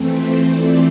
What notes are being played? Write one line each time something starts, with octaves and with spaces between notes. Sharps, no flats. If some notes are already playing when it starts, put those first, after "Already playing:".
Already playing: F2 E3 A3 C4
C5
D5